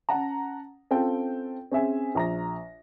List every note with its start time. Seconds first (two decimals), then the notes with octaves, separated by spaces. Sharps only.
0.09 C#4 F#5 A5 A#5
0.91 C4 C#4 F4 A4 G5
1.72 C4 C#4 G#4 C5 E5 G#5
2.15 A#1 A#5 A#6